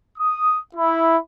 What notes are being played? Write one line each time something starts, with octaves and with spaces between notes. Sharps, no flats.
D#6
E4